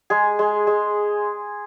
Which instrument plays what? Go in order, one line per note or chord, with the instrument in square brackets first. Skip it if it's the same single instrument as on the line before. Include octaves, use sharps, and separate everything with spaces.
[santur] G#3 G#4
G#3
G#3